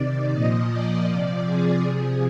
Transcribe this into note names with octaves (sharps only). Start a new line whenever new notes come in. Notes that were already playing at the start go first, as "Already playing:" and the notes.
Already playing: C3 D#3 D5
A#2 F3 D#5
D5
C3 F3 D5
G#4
C3 F3